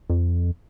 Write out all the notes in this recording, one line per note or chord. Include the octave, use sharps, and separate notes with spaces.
F2